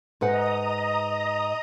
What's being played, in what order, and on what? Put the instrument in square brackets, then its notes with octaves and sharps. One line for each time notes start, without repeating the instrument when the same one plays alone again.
[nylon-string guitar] G#2 B4 F#5 [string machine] D#5 A#5 D#6